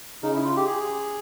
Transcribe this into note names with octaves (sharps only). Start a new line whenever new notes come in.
C#3 D#4
E4
F4
G4
G#4